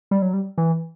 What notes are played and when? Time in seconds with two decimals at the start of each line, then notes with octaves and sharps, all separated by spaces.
0.11 G3
0.22 F#3
0.33 G3
0.58 E3